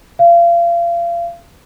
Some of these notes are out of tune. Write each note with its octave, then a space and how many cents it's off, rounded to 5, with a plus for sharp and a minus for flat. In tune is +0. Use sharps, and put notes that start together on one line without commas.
F5 -30